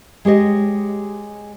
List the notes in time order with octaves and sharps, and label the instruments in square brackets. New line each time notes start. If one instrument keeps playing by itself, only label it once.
[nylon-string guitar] G#3 G4 C#5 D#5